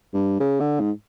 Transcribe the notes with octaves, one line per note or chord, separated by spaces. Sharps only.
G2
C#3
D3
G#2